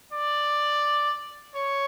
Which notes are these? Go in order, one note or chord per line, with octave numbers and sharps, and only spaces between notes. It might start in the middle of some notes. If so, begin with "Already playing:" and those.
D5
C#5